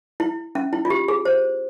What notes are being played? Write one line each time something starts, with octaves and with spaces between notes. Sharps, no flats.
E4
C#4
E4
F4
G4
G#4
C5